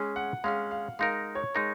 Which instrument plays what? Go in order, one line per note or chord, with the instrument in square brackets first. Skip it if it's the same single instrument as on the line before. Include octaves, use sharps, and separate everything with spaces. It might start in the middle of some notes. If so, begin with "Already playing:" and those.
Already playing: [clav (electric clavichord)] G#3 C#4 G#4
[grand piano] F#5
[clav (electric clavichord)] G#3 C#4 G#4 [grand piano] F5
[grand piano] F5
[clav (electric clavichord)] G#3 D#4 A#4 [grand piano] F5
[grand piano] C#5
[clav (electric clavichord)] G#3 D#4 A#4